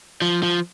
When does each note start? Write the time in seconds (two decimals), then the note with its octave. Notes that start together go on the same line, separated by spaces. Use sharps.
0.22 F3
0.43 F3